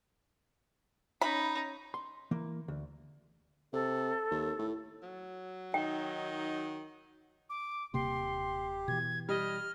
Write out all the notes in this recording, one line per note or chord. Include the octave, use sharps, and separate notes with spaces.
C#4 D#4 B5
C6
E3 A#3
D2
C3 A4
D#2
A2
F#3
D#3 D#4 G5
D6
D#1 C3 A#3 G4 C6
B2 E3 G#6
G3 D#5 F6